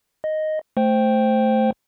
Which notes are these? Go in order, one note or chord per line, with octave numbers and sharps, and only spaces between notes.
D#5
A3 C5 G5